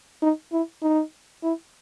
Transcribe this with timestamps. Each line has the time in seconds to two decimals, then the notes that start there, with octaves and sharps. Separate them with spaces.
0.22 D#4
0.52 E4
0.83 D#4
1.43 E4